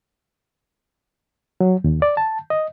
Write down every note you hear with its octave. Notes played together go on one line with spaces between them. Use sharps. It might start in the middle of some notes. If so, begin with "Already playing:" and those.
F#3
D#2
D5
A5
D#5